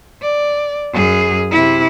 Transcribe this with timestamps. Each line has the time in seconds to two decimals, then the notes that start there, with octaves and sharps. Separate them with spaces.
0.22 D5
0.93 F#2 G#4
1.52 C3 E4